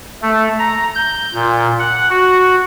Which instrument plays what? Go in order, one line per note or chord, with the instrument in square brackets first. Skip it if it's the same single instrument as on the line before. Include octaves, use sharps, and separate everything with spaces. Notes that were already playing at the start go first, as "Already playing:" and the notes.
[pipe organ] A3
A#5
G6
A#2
F#5
F#4